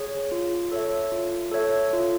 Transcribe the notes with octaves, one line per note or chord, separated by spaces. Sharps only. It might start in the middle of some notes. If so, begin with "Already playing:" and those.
Already playing: G#4 C#5
F4
A4 C#5 E5
F4
A4 C#5 E5
F4